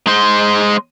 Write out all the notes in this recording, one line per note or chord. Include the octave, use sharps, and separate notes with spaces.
G#3 C5